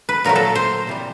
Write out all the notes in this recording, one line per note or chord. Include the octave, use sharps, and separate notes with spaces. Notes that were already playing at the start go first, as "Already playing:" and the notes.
B4
A#2 F#3 A3 A#4
A4
C5
C3 E3 G3